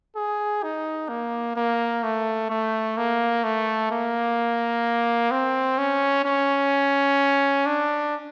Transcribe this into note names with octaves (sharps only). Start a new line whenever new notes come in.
G#4
D#4
A#3
A#3
A3
A3
A#3
A3
A#3
C4
C#4
C#4
D4